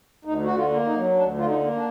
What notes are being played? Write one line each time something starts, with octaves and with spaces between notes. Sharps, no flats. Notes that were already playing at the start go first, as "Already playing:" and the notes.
D2 D#4
D3 F#4
F4
A#3
D#4
F#3
D2 D4
D3 F4
D#4
A#3
D4